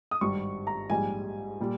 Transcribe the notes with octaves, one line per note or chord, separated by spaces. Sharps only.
D#6
G#1 G2 G3 C#6
A#5
A#1 G#2 G3 G#5
A#2 G3